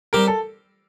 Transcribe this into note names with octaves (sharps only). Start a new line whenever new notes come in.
G3 C4 G4 A#4
A4